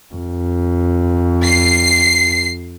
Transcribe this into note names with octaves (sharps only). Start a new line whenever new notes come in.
F2
C7